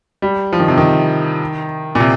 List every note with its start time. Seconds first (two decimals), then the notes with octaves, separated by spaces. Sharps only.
0.22 G3
0.53 F3
0.60 D#3
0.68 C3
0.78 D#3
1.95 A#2
2.00 C3